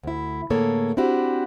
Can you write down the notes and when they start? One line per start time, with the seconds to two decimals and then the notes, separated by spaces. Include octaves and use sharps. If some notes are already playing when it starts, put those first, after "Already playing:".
0.03 D2 E4
0.50 A2 D3 A#3 G#4 A4 C#5
0.97 C4 D4 E4 F#4 G4